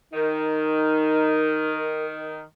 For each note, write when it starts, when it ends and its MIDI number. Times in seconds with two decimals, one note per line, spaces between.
0.13 2.41 51
0.13 1.83 63
0.13 2.06 70